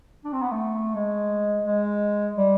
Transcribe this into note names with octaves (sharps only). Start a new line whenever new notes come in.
D4
C4
B3
A3
G#3
G#3
G3